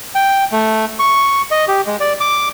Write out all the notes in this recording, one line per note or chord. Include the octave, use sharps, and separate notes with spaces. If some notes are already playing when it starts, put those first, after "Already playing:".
G5
A3
C#6
D#5
G4
G#3
D5
D6